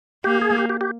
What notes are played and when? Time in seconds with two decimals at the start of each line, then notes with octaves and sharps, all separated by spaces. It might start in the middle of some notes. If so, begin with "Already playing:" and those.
0.24 A#3 G4
0.41 G#4
0.58 G4
0.69 G4
0.81 G4